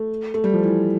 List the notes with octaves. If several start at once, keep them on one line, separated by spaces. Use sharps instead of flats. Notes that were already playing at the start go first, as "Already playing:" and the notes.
Already playing: A3
A3
G3
F3
E3